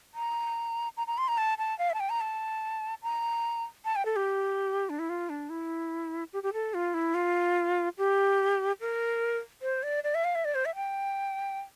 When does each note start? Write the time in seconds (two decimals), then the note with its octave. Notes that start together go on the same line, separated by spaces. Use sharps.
0.14 A#5
0.97 A#5
1.07 A#5
1.18 C6
1.28 A#5
1.38 A5
1.58 A5
1.79 F5
1.90 E5
1.94 A5
2.00 G5
2.10 A#5
2.21 A5
3.03 A#5
3.85 A5
3.96 G5
4.05 A4
4.16 G4
4.90 D4
4.99 E4
5.09 F4
5.30 D4
5.50 E4
6.33 G4
6.43 G4
6.53 A4
6.74 F4
6.94 E4
7.15 F4
7.98 G4
8.81 A#4
9.62 C5
9.83 D5
10.04 D5
10.15 E5
10.24 F5
10.35 E5
10.45 D5
10.55 C5
10.65 E5
10.75 G5